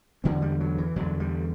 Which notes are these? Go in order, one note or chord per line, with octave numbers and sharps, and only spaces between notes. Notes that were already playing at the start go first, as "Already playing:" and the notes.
E2 D3 C4
G3
F#3
E3
E2 D3 F#3
G3